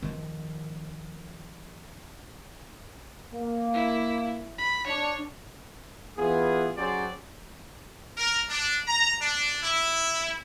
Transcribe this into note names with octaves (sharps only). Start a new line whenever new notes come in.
D#3 F3
A#3
E4
B5
D4 C#5
E3 B3 F4 G#4
F#3 C#4 G4 G#4 C5 D5
A#4
D4
A#5
D4
E4